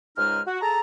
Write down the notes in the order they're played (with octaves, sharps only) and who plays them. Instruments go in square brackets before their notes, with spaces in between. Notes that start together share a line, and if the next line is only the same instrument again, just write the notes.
[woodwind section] C#2 G#2 G#3 D#4 F6
F#4
G#4 A4 A5 A#5